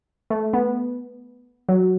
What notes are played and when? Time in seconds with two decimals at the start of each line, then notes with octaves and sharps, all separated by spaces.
0.30 A3
0.53 B3
1.69 F#3